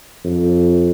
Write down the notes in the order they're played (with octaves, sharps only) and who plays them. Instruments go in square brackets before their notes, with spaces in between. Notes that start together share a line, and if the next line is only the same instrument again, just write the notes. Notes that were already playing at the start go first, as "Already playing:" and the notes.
[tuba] F2